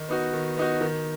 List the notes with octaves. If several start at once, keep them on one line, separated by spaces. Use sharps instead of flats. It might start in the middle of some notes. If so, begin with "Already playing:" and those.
Already playing: D#3
B3 D#4 F#4
D#3
B3 D#4 F#4
D#3